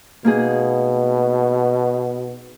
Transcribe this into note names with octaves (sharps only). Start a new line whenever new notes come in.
B2 A#3 D#4 G#4